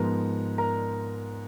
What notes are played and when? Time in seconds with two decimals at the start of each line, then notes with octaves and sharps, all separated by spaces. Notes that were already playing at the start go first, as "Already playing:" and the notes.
Already playing: G#2 F3 B3 A#4 A#5
0.58 A#4 A#5